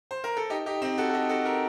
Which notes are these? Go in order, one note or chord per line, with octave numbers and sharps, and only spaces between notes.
C5
A#4
A4
D#4 G4
D#4 G4
C4 D#4
F#4 A4
A4
D#4 G4
F#4 A4
G4 A#4